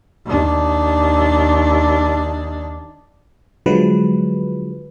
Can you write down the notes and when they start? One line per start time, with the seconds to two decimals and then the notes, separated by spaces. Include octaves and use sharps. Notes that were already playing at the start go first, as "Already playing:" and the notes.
0.26 D#2 D4
3.66 D3 F3 F#3 G#3 B4